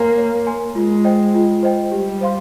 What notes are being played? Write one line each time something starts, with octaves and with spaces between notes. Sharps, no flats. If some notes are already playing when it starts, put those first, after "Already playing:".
Already playing: A#3 C#5 G#5 C6
C#5
G#5 C6
G#3 F4
C5 D#5 G5
F4
C5 D#5 G5
G3 G4
C5 F5 C6